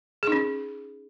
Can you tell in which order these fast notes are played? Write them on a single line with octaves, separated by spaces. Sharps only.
G#4 D#4 C#4